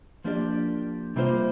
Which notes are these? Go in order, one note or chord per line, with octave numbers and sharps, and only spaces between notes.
F3 A#3 D4 G4 D5
C3 G3 A#3 F4 C5